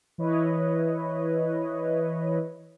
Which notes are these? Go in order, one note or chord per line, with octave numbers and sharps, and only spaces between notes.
E3 E4 B4 C#5 D#5